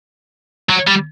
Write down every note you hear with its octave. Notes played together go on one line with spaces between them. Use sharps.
F#3
G3